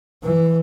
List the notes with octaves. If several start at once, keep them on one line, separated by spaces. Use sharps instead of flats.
E3